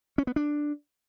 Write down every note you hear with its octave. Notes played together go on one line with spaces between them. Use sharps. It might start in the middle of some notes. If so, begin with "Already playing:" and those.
C#4
B3
D4